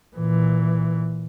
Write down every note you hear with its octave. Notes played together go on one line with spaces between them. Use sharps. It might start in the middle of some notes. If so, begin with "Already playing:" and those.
A#2 E3